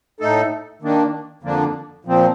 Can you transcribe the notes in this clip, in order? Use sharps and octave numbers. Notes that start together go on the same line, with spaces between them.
A2 A3 D#4 A4
D#3 A#3 D4
F2 D3 F3 A#3 D4
A#2 F3 C4